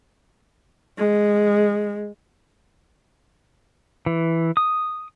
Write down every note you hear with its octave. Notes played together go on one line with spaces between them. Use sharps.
G#3
E3
D#6